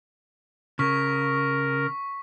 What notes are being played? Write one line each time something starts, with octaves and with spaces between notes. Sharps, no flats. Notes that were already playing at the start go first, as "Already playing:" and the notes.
C#3 A#4 C#6 B6